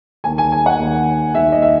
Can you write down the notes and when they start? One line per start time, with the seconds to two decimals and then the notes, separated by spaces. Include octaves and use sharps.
0.24 D#2 D#3 G#5
0.38 G#5
0.52 G#5
0.66 F#5
0.79 D#2 D#3
1.35 D#2 D#3 E5
1.52 D#5
1.62 E5